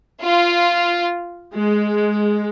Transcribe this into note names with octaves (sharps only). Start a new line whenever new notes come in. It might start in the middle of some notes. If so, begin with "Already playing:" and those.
F4
G#3